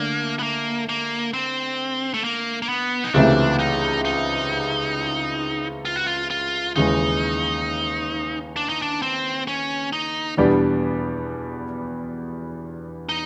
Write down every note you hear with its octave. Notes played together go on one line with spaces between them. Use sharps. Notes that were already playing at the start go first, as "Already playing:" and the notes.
Already playing: D3 A3 A#3 D4
B3
A#3
A#3
C4
A3
A#3
A#3
B3
D#4
C#2 C3 E3 A3 D4
D#4
D#4
F4
F#4
F4
F4
D#2 C#3 E3 G#3 D#4
D4
D#4
D4
C4
C#4
D#4
E2 B2 G3 B3 D4
D#4